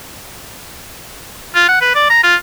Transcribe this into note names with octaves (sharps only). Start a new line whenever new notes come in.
F4
F#5
B4
D5
A#5
F4